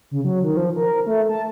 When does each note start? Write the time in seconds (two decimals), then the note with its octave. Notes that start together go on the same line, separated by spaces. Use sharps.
0.11 C#3
0.25 F#3
0.44 D#3
0.57 F3
0.76 A#4
1.06 A3
1.29 A5